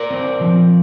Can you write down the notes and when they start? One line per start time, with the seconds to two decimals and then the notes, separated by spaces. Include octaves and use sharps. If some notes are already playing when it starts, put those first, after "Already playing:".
Already playing: A#4 D5
0.11 C4
0.41 F3